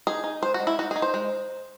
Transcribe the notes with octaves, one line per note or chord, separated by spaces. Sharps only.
D#4 G#4
D#4
G#3 C5
F#4
G#3
E4
D#4 F#4
G#4
D#4
C5
G#3